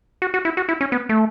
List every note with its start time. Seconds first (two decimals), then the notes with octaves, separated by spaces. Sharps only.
0.22 F#4
0.34 F#4
0.45 E4
0.57 F#4
0.69 E4
0.81 C#4
0.92 B3
1.09 A3